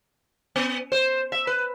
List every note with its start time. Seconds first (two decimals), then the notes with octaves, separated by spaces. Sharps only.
0.56 B3
0.92 C5
1.32 E5
1.47 B4